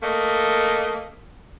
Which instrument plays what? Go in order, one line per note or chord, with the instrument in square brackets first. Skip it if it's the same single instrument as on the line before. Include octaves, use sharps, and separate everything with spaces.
[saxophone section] A3 A#3 D#5